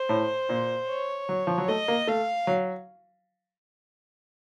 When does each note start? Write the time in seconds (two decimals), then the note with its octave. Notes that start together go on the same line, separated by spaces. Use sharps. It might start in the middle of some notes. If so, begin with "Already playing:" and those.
Already playing: C5
0.09 A2
0.49 A#2
0.88 C#5
1.29 F#3
1.47 F3
1.58 F#3
1.68 A3 D#5
1.88 A#3
2.07 A3 F5
2.47 F#3